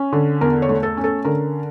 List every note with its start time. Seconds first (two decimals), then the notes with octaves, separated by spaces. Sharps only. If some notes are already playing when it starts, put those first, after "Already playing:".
Already playing: C#4
0.13 D3
0.41 E2 A#4
0.62 C#5
0.69 A3
0.83 A4
0.97 C#4
1.04 A4
1.24 D3 A#4